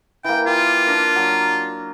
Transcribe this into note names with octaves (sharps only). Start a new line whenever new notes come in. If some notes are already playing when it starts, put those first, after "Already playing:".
E3 A#3 G5
F4 G4
D4 A#4
F#3